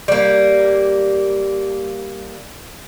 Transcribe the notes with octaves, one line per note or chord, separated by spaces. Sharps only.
G3 A#3